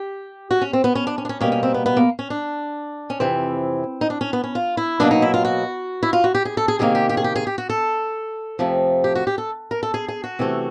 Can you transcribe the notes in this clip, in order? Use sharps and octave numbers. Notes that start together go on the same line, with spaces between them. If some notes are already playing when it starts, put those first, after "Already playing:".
Already playing: G4
F#4
C#4
C4
B3
C#4
D4
C#4
D4
C#4
B2 G3 A#3 C#4
C#4
C4
B3
B3
A#3
C#4
D4
C#4
F2 C3 E3 C4
D#4
D4
C#4
B3
C#4
F4
E4
B2 F#3 A#3 D4
D#4
E4
F4
F#4
E4
F4
F#4
G4
G#4
A4
G#4
C3 D#3 G3 A#3 G#4
G4
G4
G#4
G4
G#4
G4
F#4
A4
F2 C3 F3 A3
G4
F#4
G4
A4
A#4
A4
G#4
G#4
F#4
C3 E3 A3